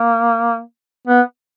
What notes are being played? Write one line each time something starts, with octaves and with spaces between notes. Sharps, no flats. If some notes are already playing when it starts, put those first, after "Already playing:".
Already playing: A#3
B3